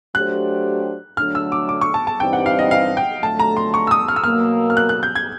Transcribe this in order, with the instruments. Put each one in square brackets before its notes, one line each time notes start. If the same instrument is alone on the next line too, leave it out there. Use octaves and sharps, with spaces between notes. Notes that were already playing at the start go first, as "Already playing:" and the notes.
[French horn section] F#3 A3 D4 G4 C5 [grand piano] F#6
[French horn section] D3 F#3 A3 D4 [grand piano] F6
[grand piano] E6
D6
D6
C#6
A5
A5
[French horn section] G2 E3 G3 C4 D#4 [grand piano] G5
[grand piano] F#5
F5
D#5
F5
G5
[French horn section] F2 D3 F#3 A3 [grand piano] A5
[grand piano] A#5
C6
C#6
E6
D#6
F6
E6
[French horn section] B2 F#3 A#3 [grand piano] F6
[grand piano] F6
F#6
F#6
G6
G#6